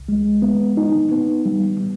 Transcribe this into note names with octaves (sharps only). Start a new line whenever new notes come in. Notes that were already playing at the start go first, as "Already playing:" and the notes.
Already playing: C2
G#3
B3
D#4
B3
G3
G3